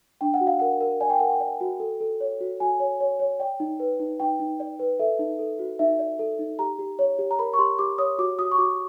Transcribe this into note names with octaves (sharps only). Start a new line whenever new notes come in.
D4 G5
F#5
F#4
F5
A#4 F#5
A#4
D5 G#5
G5
A#4 F#5
G5
D5
F#4
A4
A4
C#5
F#4
F#4 G#5
C#5
C#5
C#5
D5 G5
D#4
B4
D#4
D#4 G5
D#4
D5
B4
A4 E5
D#4
A4
F#4
D#4 E5
D5
A4
D#4
G4 A#5
G4
C#5
G4
A#5
A#4 B5
C#6
G4 C6
G4 D6
C#5 D#6
F#4 D6
F#4 D#6
C#6
F#4 D6